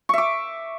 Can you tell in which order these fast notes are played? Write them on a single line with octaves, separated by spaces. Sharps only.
C#6 E5 D6